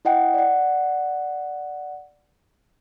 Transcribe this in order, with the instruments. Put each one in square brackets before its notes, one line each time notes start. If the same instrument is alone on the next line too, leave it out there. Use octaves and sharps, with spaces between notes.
[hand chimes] E4 D#5 F#5 G5
D5 F#5